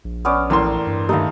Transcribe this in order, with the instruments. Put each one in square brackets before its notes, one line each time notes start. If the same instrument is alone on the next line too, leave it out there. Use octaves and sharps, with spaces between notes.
[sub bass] A#1
[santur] B3 C#4 D5
[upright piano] E2 A2 C6 [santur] A#3 C5
[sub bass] G2
[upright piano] D#2 A3 [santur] D#4 E4 F5